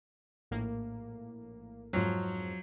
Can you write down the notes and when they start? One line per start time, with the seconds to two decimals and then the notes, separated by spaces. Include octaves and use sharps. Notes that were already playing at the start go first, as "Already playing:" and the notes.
0.51 A#1 A2 A#3
1.93 F2 G#2 F3 F#3